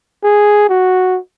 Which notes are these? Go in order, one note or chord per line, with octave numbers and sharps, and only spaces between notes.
G#4
F#4